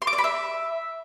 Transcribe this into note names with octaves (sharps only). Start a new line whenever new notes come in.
C6
D6
D5
B5
E5